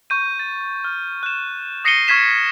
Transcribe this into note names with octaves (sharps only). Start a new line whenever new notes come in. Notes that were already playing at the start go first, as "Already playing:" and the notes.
C#6 G6 D#7
A6
F6
F#6 E7
D#6 A#6 C7 C#7 D#7 G7
C#6 F6 G#6 B6 E7 G7